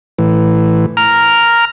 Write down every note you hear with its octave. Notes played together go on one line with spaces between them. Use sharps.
A2 E3
A#5 F6